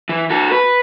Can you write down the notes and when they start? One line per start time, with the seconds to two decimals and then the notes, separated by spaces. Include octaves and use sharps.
0.09 E3
0.30 F#4 A4
0.51 B4